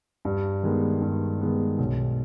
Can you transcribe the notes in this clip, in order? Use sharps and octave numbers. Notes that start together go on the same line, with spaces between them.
G2
D#3 G#3 B3
G2
D#3 G#3 B3
B1